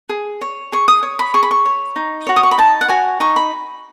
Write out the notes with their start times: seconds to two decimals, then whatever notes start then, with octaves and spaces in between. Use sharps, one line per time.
0.09 G#4
0.41 C#5
0.72 G#4 C#6
0.88 D#6
1.03 C#5
1.19 B5
1.34 G#4 C#6
1.43 B5
1.51 C#6
1.66 C#5
1.96 D#4
2.27 F#4 C#5
2.36 D#6
2.43 C#6
2.51 B5
2.58 D#4 A5
2.81 F#5
2.88 F#4 C#5 G#5
3.20 D#4 C#6
3.36 B5